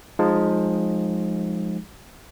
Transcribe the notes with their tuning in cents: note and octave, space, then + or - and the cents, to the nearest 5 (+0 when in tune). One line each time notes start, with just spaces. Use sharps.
F3 +20 G#3 +0 D#4 -5